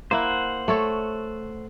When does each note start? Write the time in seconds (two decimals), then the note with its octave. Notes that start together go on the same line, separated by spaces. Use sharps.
0.11 A#3 E4 C5 F#5
0.68 A3 A4 C#5